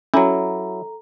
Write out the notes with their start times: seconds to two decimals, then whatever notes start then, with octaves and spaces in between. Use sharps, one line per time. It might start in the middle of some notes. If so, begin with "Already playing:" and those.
0.14 F#3 C#4 E4 A4 A#5